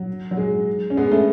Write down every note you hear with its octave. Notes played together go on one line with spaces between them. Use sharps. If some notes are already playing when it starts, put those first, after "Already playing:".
Already playing: F#3
F#3
G#3
C#4
G#3 B3
A3 C#4